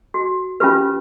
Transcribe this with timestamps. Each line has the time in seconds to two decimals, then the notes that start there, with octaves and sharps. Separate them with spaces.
0.14 F#4
0.60 C#4 F4 G4 B4